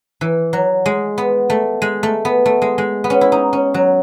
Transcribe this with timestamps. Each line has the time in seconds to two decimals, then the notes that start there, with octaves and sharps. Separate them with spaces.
0.21 E3
0.53 F#3
0.86 G#3
1.18 B3
1.50 A3
1.82 G#3
2.03 A3
2.25 B3
2.46 A3
2.62 G#3
2.78 G#3
3.04 B3
3.10 C#4
3.21 E4
3.32 D#4
3.53 C#4
3.74 F#3